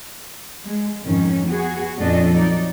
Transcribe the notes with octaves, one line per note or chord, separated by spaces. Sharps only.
G#3
F2 G#2 D#3 C#4
B3 F#4 G#4
F2 A#2 C#4 D4 A4 D#5
F#3 D#4 D5